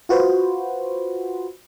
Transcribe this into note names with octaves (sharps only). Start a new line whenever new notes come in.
F4 F#4 B4 C5